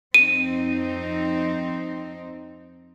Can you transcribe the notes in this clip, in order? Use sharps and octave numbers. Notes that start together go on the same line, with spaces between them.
F2 C4 D#4 D#7